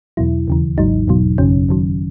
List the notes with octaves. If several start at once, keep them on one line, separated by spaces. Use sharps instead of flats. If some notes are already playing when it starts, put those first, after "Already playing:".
E2 B2 F#3 E4
D#2 C#3 E3
G#1 G#2 F#3 D#4
E2 B2 F#3
G#1 F#2 C#3 F#3 C#4
F#2 D#3 F#3